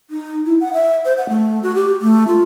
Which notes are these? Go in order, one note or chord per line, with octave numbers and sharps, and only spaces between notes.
D#4
E4
F#5
E5
C5
F#5
A3
F#4
G4
A3
F4